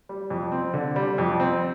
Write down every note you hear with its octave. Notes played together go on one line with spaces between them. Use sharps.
G3
F2
C4
D3
G3
F2
C4